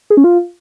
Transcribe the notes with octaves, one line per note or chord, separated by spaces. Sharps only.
G#4
C#4
F4